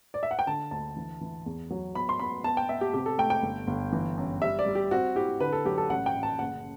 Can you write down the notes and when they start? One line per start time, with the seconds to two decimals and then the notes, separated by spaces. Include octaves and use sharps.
0.14 D5
0.23 E5
0.31 F#5
0.39 G5
0.47 D3 A5
0.71 D2 A5
0.96 E3
1.21 E3
1.46 E2
1.71 F#3
1.95 B3 B5
2.09 C6
2.20 B3 B5
2.44 B3 A5
2.57 G5
2.69 B3 E5
2.81 G4
2.94 C3 G4
3.06 A4
3.18 A3 G5
3.30 G5
3.43 G1
3.67 G1
3.92 E3
4.17 F#2
4.42 G3 E5
4.59 D5
4.66 G3
4.75 G4
4.91 C4 F#4
5.15 E4 G4
5.40 D3 B4
5.53 A4
5.65 F#3 G4
5.78 A4
5.90 A1 F#5
6.06 G5
6.15 A1
6.23 A5
6.39 F#1 F#5